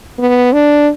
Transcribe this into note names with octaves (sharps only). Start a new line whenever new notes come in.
B3
D4